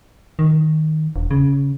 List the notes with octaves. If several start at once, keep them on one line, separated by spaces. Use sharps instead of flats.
D#3
E1
C#3